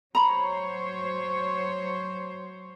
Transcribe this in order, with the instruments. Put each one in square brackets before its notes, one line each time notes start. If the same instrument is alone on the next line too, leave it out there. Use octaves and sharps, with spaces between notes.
[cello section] F#3 C5 C#5 [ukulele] A#5 B5